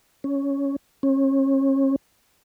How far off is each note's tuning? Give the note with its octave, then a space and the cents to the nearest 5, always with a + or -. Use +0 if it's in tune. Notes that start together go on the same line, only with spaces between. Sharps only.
C#4 +5
C#4 -35